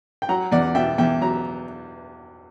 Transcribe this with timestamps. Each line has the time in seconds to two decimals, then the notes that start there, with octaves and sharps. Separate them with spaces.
0.22 G5
0.29 F#3 F#5 A#5
0.52 E2 D5 F#5
0.75 B2 E5 G5
0.98 E2 E5 G5
1.21 F#3 A#5